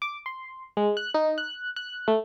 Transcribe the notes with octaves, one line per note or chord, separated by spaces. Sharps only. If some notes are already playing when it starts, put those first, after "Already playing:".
D6
C6
G#3
F#6
D#4
F#6
F#6
A3